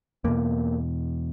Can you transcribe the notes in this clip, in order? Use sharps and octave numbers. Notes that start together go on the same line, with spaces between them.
E2 B2 A#3